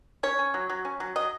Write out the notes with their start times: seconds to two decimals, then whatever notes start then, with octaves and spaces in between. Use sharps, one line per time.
0.23 C#4 C#5
0.39 C#4
0.54 F#3
0.70 F#3
0.85 C#4
1.00 F#3
1.16 F#3 D#5